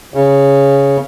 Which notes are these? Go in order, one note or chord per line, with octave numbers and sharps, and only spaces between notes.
C#3